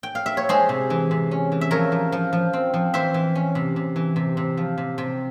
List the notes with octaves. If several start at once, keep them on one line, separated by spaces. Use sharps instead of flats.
G5
F5
E5
C#5
G#3 G#4 C5
C3
E3
C3
C#4
E3
E5
F3 A#4 C#5
F3
F3
F3
C4
F3
E3 C5 E5
E3
C#4
C3
C3
E3
C3
C3
F3
C3
C3